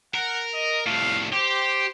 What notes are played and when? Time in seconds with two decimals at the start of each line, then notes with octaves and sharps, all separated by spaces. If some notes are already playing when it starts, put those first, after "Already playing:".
0.14 A#4 F#5
0.54 D#5
0.87 C2 A2 F5
1.33 G4 C5